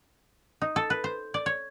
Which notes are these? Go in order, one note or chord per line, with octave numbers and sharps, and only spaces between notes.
D#4
A4
B4
C5
D5
C#5